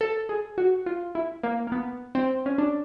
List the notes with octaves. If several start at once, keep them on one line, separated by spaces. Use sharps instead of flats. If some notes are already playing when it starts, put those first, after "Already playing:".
A4
G#4
F#4
F4
E4
A#3
A#3
B3
C4
C#4
D4